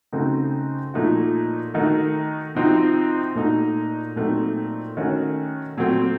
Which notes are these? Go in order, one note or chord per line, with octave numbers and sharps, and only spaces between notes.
C#3 A3 C4 D#4 F#4
A#2 F3 A3 D#4 F#4
D#3 A3 D#4 F#4
C3 F3 C4 D#4 F#4
A#2 A3 D#4 F#4
A#2 F#3 A3 C4 D#4
D#3 A3 C#4 F#4
A#2 F#3 A3 C4